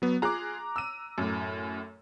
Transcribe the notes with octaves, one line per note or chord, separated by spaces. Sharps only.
F#3 B3
F4 G#4 A#5 D6 F#6
E6 D#7
F#2 A2